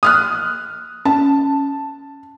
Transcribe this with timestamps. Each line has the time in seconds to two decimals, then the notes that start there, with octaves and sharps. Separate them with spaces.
0.03 D#6 F6 F#6
1.05 C#4 A5